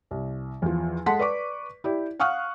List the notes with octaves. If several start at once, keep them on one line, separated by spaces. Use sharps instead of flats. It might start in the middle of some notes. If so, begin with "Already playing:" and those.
C2
E2 F3
G#3 A4 F#5 A5 C6 B6
B4 D5 C#6 D6
E4 G4 D5
F5 F#5 C#6 D#6 F6 F#6